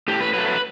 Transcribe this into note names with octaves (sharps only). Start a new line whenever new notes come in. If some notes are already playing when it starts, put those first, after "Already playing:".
A2 G4
B4
F#3 A3 B4
B4